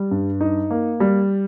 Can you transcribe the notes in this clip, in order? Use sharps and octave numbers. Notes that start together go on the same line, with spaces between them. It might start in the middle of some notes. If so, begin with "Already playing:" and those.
Already playing: G3
G2
D#4
A#3
G3